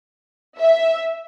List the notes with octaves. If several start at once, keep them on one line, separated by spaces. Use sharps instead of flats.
E5